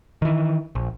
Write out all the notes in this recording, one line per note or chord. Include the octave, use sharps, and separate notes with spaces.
D#3 E3
A#1